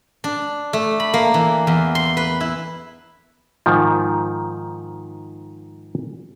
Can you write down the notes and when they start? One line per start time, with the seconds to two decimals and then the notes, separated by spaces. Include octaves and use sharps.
0.24 D4
0.73 A3
1.00 B5
1.14 A#3
1.34 E3
1.67 E2
1.95 C6
2.17 B4
2.40 E4
3.66 G#2 D#3 F3